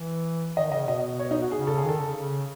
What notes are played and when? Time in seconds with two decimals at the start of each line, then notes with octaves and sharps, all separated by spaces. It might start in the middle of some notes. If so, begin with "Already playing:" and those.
Already playing: E3
0.57 D#3 D#5
0.72 C#3 D#5
0.88 B2 D#5
1.19 C#5
1.31 D#4
1.42 F#4
1.52 C#3 G#4
1.67 A4
1.78 G#4
1.84 D#3 A4
2.00 C#3
2.16 C#3